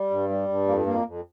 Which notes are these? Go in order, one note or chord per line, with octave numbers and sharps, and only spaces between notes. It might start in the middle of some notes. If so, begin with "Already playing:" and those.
Already playing: G3
G2
G3
G2
F2 A#3
F2 A#3
F2